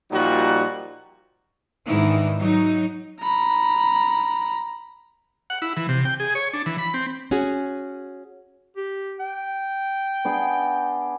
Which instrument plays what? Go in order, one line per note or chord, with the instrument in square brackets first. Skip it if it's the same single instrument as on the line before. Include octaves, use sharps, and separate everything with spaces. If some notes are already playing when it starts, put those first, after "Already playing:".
[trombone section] A#2 F3 G3 D#4 F#4
[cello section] G#2 D#3 E3 D4 E4
F#3 D#4
[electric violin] A#5 B5
[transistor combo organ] F#5
E4
E3
C3
G5
G#4
C#5
D4
E3
B5
C4
[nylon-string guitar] C#4 F#4 G#4
[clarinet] G4
G5
[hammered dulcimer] B3 D4 G#4